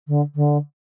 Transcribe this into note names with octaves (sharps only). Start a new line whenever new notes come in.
D3
D3